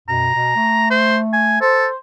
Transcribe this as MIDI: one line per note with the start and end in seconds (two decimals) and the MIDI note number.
0.09 0.29 42
0.09 0.29 47
0.09 0.87 82
0.34 0.53 47
0.57 1.57 57
0.90 1.18 72
1.33 1.57 80
1.61 1.86 69
1.61 1.97 72